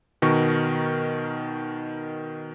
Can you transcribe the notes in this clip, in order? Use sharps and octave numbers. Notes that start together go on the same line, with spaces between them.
B2 D#3 A#4 C#6